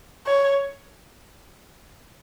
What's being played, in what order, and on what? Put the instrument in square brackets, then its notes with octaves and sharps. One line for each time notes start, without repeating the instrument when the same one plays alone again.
[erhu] C#5